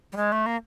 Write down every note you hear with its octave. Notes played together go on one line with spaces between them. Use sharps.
G3
G#3
A3
A#3